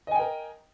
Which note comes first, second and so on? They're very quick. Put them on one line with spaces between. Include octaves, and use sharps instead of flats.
D#5 G#5 G5 A#4